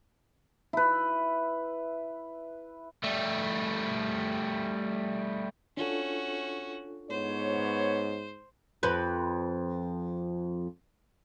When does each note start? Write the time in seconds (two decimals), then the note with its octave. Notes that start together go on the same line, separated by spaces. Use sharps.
0.73 E4 B4
3.03 G3 A3
5.77 C#4 D4 F4 F#4 A4
7.10 G#2 B3 C5 C#5
8.83 F2 B4